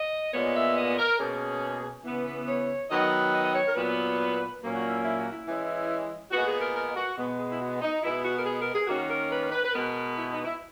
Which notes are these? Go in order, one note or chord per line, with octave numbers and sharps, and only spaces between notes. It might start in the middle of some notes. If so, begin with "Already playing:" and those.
Already playing: D#5
A#2 G#3 B3 C#5
E5
D#5
A#4
B2 A#3 C#4 G#4
C#3 E3 B3
B4
C#5
D#3 F#3 B3 D#5
D#5
D#5
C#5
A#4
A#2 F#3 B3 B4
A#2 F#3 A#3 C#4
F#4
E4
E4
F#4
E4
E3 G#3 C#4
A#2 G#3 B3 F#4
G#4
A#4
A#4
F#4
B2 G#3 B3
G#4
E4
F#4
D#4
B2 G#3 B3 E4
F#4
A#4
G#4
A#4
G#4
D#3 A#3 C#4 F#4
A#4
B4
B4
B4
B2 G#3 B3 A#4
E4
D#4
E4